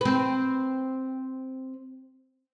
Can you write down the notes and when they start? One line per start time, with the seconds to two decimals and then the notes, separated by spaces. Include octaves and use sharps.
0.01 C4 B4